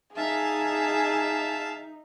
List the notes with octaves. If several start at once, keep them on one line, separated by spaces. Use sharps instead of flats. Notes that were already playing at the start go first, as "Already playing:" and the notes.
D#4 G#4 E5 F5 A5